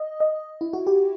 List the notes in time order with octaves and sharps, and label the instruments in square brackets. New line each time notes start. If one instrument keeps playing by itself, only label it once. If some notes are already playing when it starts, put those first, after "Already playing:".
Already playing: [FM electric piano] D#5
D#5
E4
F#4
G4